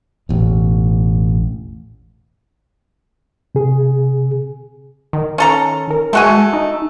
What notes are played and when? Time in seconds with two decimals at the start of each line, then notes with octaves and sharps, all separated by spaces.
0.29 E1 A1
3.55 C3 G#4
5.13 D#3
5.38 C#4 A4 A#5
5.91 A#4
6.13 G#3 A3 F#4 G#5
6.53 D#4